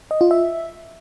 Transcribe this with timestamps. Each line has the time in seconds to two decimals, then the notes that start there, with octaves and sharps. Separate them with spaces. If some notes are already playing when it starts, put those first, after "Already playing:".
0.11 D#5
0.21 F4
0.31 E5